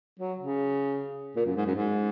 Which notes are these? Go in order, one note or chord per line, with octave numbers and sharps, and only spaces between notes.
F#3
C#3
A#2
F#2
G#2
F#2
G#2